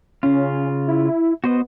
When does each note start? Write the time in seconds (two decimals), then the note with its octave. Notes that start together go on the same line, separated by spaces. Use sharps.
0.23 C#3 C#4 F4
0.88 E4
1.44 B3 F#4 C5 D#5